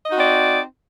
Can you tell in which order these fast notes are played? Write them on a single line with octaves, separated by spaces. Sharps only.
D#5 D#4 F#4 C4 D5